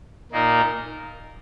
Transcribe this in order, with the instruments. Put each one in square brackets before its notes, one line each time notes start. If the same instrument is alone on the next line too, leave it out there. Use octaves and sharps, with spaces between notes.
[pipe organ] A#2 A#3 D#4 A#4